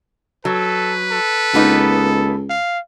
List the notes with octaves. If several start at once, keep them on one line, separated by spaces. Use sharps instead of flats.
F#3 A4 B4
A4
C#2 A#3 B3 D#4
F5